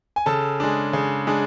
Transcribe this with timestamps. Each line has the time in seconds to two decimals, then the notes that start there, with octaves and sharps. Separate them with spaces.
0.16 G#5
0.26 C#3 A4 A5
0.60 G#3 D4
0.93 C#3
1.27 G#3 D4